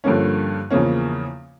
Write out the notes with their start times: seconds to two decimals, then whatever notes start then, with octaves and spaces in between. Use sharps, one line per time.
0.04 G2 D3 F3 A#3 C#4
0.70 E2 C#3 F3 A#3 C#4